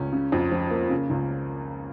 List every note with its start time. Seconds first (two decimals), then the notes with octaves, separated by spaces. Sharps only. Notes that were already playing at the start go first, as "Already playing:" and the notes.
Already playing: C#2 C#4
0.13 C#3
0.32 F2
0.52 F3
0.71 A#3
0.90 C#3
1.10 C#2